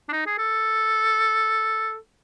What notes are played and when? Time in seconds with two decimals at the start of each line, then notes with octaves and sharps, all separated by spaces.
0.09 D4
0.12 D#4
0.26 G#4
0.38 A4